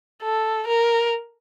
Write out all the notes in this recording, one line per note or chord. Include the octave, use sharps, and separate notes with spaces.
A4
A#4